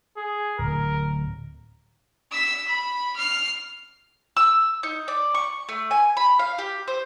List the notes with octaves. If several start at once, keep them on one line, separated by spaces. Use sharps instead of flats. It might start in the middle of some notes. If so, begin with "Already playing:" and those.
G#4
D1 A#4
E6 B6
B5
F6 C7
E6
D#4
D5
C#6
A3
G#5
B5
F5
G4
C5